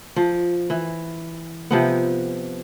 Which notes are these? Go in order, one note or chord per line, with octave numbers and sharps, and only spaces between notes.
F3
E3
C3 F3 B3